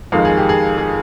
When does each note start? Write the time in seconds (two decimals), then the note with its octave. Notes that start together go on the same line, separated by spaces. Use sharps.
0.12 F2 D#3 G#3 F5
0.25 G#4
0.37 G4
0.49 G#4
0.78 G#4